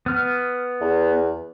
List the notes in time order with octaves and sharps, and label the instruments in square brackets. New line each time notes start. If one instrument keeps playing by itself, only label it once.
[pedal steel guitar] B3 F6
[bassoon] E2